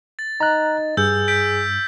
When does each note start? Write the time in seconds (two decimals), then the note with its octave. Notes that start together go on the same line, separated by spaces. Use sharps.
0.19 A6
0.40 D#4 A#5 F#6
0.97 G2 G#4 E6 G6
1.28 G6 B6 D7